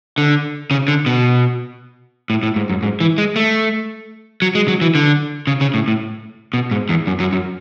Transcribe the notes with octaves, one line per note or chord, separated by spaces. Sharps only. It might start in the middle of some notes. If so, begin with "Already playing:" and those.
D3
C#3
D3
B2
A2
A2
G#2
F#2
G#2
E3
G#3
A3
F#3
G#3
F#3
E3
D3
C#3
C#3
A2
A2
B2
G#2
E2
F#2
F#2
F#2